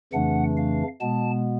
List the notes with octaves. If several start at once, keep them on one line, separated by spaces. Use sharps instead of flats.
F2 C#3 E3 A3 D4 F#5
F5
B2 G#3 B3 A5